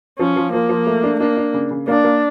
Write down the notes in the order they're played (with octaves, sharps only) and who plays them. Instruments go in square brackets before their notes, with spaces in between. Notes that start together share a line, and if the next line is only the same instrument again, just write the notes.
[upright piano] F3 [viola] C#4
[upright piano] F3
[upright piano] F3 [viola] A#3
[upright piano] F3
A3
D4
[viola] A#3 [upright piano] D4
[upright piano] D4
C#3
C#3
[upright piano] A#3 [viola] D4
[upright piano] A#3